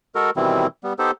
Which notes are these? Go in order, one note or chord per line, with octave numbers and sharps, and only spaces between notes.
G#3 F#4 A4 A#4
B2 D#3 E3 G3 C4 E4
G3 B3
B3 D#4 G4 A4 C5